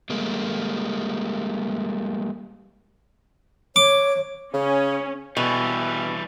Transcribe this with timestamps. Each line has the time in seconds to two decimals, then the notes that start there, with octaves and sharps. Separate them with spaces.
0.10 G3 G#3 A#3
3.76 C#5 D6
4.54 C#3 C#4
5.37 B2 E3 G3